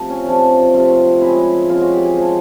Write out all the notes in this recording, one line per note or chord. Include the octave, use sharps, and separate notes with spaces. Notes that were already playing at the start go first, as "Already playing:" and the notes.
Already playing: C3 F3 A3
C#4
C3 F3 A3 D4
C3 F3 A3 F4
C#3 F3 G#3 C4 E4
C#3 F3 G#3 C4 F4
F#4
G4
G#4
C#3 F3 G#3 C4 A4